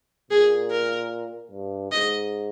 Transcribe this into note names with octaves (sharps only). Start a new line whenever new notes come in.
A#2 G#4
A#4
G2
G#2 D#5